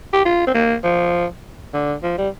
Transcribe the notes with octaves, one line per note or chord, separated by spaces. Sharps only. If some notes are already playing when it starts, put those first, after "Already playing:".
G4
F4
C4
A#3
F3
D3
F3
G3